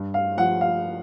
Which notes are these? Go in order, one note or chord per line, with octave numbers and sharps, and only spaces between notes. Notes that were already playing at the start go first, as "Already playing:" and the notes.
Already playing: G2
F5
F3 F#5
F5